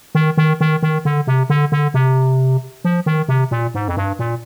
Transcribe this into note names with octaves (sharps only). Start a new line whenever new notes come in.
D#3
D#3
D#3
D#3
D3
C3
D3
D3
C3
F3
D#3
C3
A#2
G#2
F2
G2
A#2